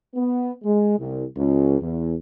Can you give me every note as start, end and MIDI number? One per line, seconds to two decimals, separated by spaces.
0.15 0.51 59
0.63 0.95 56
0.98 1.23 36
1.37 1.78 37
1.80 2.14 40